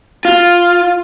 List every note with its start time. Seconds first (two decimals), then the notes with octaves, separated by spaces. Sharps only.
0.25 F4